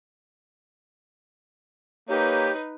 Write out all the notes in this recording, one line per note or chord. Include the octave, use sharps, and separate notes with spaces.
A#3 D#4 G4 B4 C#5